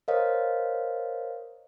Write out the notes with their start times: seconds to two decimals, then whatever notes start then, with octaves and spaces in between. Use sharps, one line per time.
0.08 A#4 C5 C#5 D#5 F5